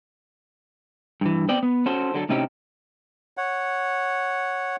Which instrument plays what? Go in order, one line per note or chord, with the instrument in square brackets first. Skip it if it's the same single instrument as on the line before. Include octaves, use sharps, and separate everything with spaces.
[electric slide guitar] G2 E3
B3 C4 D5 G5
B3
C#4 F#4 A4 C5
D3 F#3 A4
A2 C3 C4 C#4 D#4 G4
[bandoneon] C#5 F#5